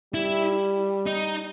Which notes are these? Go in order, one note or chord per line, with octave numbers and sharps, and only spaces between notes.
G3 E4
D#4